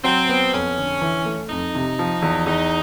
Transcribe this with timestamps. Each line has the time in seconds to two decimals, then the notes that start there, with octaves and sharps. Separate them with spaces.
0.04 F#3 C4
0.29 B3
0.53 F2 C#4
0.77 D3
1.01 E3
1.25 A3
1.50 F2 D#4
1.75 C3
1.99 F3
2.22 E2
2.46 E2 D#4